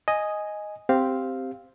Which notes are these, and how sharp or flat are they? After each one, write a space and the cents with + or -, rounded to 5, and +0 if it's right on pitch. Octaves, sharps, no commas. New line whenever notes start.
D#5 +0 G#5 +0
C4 +0 G4 +0 F5 +0